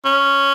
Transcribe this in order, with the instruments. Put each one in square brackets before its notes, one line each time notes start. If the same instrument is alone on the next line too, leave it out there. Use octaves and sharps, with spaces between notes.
[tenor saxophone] C#4